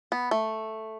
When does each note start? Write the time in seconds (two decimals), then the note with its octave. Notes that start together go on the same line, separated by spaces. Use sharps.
0.12 B3
0.31 A3